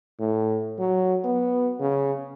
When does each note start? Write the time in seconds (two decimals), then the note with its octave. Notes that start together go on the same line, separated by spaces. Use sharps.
0.19 A2
0.79 F#3
1.24 B3
1.80 C#3